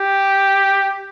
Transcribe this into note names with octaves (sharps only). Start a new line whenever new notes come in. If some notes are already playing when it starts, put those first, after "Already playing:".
Already playing: G4